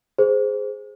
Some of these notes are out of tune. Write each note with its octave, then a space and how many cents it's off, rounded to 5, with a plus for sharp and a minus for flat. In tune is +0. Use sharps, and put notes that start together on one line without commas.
G#4 +0 C5 -10